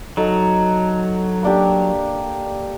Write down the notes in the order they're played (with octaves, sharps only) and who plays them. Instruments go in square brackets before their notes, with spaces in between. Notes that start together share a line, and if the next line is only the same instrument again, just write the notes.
[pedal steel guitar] F#3 [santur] D#4 A4
[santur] A#3 D4 G4